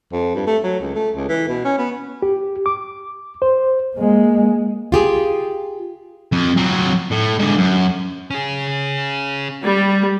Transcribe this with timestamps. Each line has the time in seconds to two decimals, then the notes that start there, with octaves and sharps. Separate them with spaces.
0.12 F2
0.35 G2
0.47 A3
0.64 F#3
0.80 C#2
0.95 A3
1.16 C#2
1.29 E3
1.48 B2
1.65 C#4
1.78 B3
2.22 G4
2.66 D6
3.42 C5
3.96 G#3 A#3
4.92 F4 G4 G#4
6.32 F2
6.57 F#3 C4
7.11 A2
7.39 G#2 D3
7.58 F#2
8.31 C#4 G#4
9.63 G3